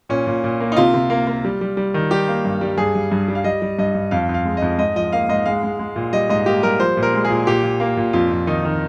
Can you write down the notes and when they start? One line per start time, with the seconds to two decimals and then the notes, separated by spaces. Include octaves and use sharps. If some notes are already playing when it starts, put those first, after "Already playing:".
0.09 A#2 C#4
0.27 A#2
0.44 A#2
0.61 A#3
0.72 D#4
0.77 C3 F4
0.94 C3
1.10 A#3
1.27 A#3
1.44 G3
1.61 G3
1.77 G3
1.94 D#3
2.11 G3 G4
2.28 A#3
2.45 G2
2.61 G3
2.78 G2 G#4
2.95 G2
3.12 G2
3.28 G3
3.35 F5
3.44 G3 D#5
3.62 G3
3.78 G2 D#5
3.95 G2
4.11 F2 F5
4.29 F2
4.34 F5
4.45 G#3
4.57 D#5
4.62 F2
4.78 G#2 D#5
4.96 F3 D#5
5.13 A#3 F5
5.29 G#2 D#5
5.46 G#3 F5
5.63 G#3
5.79 G#3
5.96 A#2
6.13 G3 D#5
6.30 G#2 D#5
6.46 A#3 G4
6.63 G3 A#4
6.80 F3 C5
6.97 A#2
7.03 A#4
7.14 G#3
7.25 G#4
7.30 A#2
7.47 A#2 G4
7.63 A#2
7.80 A#3
7.97 A#2
8.13 F2 F4
8.31 F2
8.47 D#3 D#4
8.65 D#3